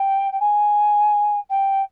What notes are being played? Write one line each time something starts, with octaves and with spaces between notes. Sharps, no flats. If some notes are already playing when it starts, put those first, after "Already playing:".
Already playing: G5
G5
G#5
G5